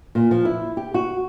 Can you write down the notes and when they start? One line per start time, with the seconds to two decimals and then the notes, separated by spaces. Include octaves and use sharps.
0.15 A#2
0.31 F3
0.45 E4
0.77 G4
0.94 F#4